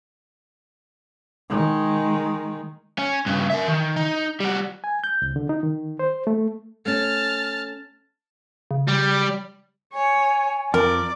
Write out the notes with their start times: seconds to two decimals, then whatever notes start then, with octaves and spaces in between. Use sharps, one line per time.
1.49 D#3 G#3
2.99 C#4
3.26 G2 C#3
3.50 A#4 E5
3.68 D#3
3.96 D#4
4.40 G3 F#4
4.84 G#5
5.04 G6
5.22 C#2
5.36 D3
5.49 D#4
5.63 D#3
5.99 C5
6.27 A3
6.86 A3 C#4 A5 F6
8.71 C#3
8.88 G3
9.94 C#5 G#5
10.74 F2 A#4 D5